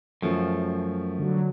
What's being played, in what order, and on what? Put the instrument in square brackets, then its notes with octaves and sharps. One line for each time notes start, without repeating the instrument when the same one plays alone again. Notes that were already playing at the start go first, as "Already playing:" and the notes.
[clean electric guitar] F#2 [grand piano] F3 A3
[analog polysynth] D3 F#3